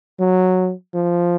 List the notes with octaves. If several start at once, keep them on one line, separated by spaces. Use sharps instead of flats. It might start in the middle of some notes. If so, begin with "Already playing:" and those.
F#3
F3